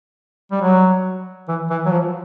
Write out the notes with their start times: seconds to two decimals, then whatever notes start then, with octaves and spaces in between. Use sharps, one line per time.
0.52 G3
0.61 F#3
1.48 E3
1.70 E3
1.85 F#3
1.91 F3